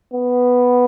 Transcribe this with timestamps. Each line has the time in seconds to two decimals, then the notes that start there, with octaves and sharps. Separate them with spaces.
0.13 B3